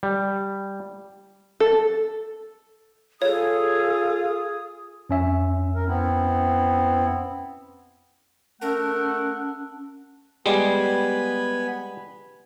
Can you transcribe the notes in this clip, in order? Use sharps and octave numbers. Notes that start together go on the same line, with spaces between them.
G3
A4
F4 G#4 A4 C#5 D#6
F2 C#4 E5
A#4
B3 C4 E4
A3 C#4 A#4 F#5 A5
G3 G#3 B3 G#5 B5